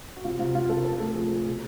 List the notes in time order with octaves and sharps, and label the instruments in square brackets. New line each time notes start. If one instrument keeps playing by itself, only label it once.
[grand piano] F#4
C3 F4
C3 F4
C3 F4
C3 A4
A#4
F3 A4
A3 A4
F3 G#4
F3
B2 G#4